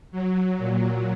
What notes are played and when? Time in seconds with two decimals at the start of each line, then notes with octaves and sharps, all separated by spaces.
0.12 F#3
0.58 A#2